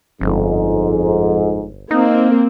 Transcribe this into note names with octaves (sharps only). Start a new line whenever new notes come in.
G1 F2 G#2
A#3 C4 D#4